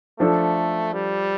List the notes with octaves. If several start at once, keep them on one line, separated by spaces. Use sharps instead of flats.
F3 A3 D4 A4
G3